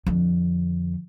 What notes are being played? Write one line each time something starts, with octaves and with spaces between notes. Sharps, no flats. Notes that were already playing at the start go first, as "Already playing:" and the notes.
F2 D3